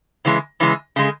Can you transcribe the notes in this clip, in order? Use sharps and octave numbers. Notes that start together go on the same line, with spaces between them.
C#3 E3 G#3
C#3 E3 G#3
C#3 G#3